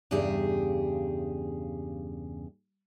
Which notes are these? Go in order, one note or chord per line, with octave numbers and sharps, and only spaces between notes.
E2 G2 C#3 G4 G#4